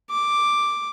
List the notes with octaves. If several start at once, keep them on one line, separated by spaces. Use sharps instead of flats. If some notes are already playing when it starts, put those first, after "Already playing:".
D6